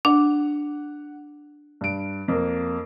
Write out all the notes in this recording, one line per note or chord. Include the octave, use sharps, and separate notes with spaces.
D4 F#5
G2 D7
F2 A#3